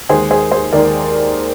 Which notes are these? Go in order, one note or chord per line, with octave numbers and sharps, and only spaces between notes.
D#2 D#3 G#3 G#4 C5
G#4 C5
G#4 C5
D#2 D#3 G#3 A#4 D5